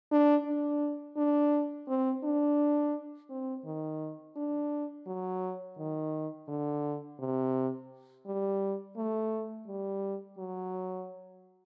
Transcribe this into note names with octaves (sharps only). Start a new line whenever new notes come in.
D4
D4
D4
C4
D4
C4
D#3
D4
F#3
D#3
D3
C3
G3
A3
G3
F#3